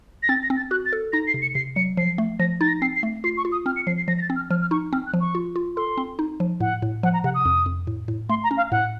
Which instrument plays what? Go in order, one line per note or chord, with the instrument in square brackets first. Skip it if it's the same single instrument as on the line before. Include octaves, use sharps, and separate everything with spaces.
[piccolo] A#6
[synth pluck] C4 [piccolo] A6
[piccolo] A#6
[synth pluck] C4
[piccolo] A6
[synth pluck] F#4 [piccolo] F#6
[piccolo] A6
[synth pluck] A4
[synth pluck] D#4 [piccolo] A#6
[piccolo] C7
[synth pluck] C3
[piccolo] C#7
[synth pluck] C3 [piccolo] C7
[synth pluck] F#3 [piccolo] C#7
[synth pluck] F3 [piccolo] C7
[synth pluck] A3
[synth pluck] F3 [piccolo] A#6
[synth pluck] D#4 [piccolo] A6
[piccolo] A#6
[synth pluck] C4 [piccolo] C7
[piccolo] C7
[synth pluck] A3
[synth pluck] F4 [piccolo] C7
[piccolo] C#6
[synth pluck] F4
[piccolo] D#6
[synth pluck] C4 [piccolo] F6
[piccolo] C#7
[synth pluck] F3 [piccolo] C7
[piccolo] C7
[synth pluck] F3 [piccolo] A#6
[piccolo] A#6
A6
[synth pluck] C4
[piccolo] F6
[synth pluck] F3 [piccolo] F6
[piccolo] F6
[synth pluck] D#4 [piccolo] C#6
[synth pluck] C4 [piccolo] F6
[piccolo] F#6
[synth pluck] F3
[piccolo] C#6
[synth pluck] F4
F4
[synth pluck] A4 [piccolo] C6
[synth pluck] C4
D#4
F3
[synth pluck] A2 [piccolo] F#5
[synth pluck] A2
[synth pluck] F3 [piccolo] F#5
[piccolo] A#5
[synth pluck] C3 [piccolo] F#5
[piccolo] D#6
[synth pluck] F2
F2
A2
A2
[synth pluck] A3 [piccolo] C6
[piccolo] A#5
[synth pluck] C#4
[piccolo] F5
[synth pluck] A2 [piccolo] F#5